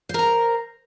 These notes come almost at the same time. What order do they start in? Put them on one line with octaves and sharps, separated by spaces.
C5 A#4 A#5